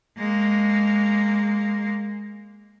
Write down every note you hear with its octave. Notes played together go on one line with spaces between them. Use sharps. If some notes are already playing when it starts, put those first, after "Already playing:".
G#3 A#3